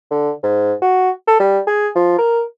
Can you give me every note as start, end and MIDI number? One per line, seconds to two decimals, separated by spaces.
0.11 0.31 50
0.43 0.73 44
0.82 1.10 66
1.28 1.36 69
1.40 1.59 55
1.67 1.88 68
1.96 2.17 53
2.18 2.43 70